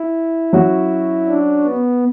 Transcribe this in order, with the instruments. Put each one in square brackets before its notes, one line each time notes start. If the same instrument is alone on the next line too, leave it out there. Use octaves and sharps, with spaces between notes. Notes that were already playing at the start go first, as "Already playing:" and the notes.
Already playing: [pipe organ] E4
[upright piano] F#3 C#4 F#4
[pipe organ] D4
B3